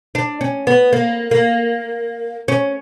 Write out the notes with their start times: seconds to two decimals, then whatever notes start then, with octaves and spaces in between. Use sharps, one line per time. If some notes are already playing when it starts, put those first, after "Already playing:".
0.15 D4
0.41 C#4
0.67 B3
0.93 A#3
1.31 A#3
2.48 C#4